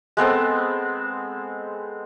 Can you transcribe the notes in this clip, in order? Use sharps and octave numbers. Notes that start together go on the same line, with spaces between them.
G#3 B3 C4 A4